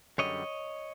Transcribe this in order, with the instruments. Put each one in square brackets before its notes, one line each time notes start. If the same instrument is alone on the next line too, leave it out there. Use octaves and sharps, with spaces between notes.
[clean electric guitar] F#2 D3 G3 C#5 D#5